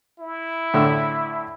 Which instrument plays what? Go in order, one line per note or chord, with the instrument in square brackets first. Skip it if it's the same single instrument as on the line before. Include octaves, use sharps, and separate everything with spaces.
[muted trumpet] E4
[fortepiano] A2 D3 E6